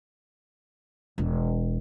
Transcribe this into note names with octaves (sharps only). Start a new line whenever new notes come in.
E1